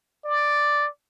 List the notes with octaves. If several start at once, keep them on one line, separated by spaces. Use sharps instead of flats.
D5